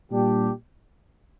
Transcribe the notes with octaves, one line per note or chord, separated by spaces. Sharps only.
A#2 G3 D4 G4